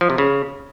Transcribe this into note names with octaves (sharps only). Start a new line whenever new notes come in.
F3
C3
C#3